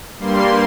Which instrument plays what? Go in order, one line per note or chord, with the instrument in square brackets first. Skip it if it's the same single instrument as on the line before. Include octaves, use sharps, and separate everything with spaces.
[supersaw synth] G2 G3 A#3 C6